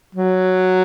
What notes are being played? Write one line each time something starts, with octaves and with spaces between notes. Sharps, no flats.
F#3